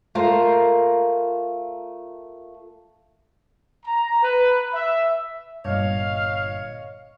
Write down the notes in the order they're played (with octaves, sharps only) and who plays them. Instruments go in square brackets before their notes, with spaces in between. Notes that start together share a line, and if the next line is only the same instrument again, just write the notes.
[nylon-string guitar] A3 F4 A#4 C5
[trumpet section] A#5
B4
E5
[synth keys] G1 A#2 D#5 [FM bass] G2 [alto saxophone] C#5 [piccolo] F5